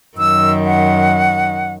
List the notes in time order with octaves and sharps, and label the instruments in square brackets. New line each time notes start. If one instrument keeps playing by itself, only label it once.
[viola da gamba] F#2 D#3 [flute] E6
[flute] F#5